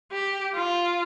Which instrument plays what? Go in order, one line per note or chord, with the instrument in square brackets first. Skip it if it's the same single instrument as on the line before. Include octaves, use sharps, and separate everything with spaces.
[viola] G4
F4